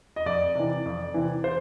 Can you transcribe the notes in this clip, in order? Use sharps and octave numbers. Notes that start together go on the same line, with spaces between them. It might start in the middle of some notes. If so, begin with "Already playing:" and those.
D#5
F2 D5
C3 E3
F2
C3 E3
C5